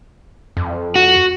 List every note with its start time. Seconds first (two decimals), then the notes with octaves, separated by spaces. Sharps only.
0.57 F2
0.96 F#4